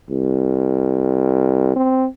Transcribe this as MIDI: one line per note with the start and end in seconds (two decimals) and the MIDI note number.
0.10 1.74 36
1.76 2.06 60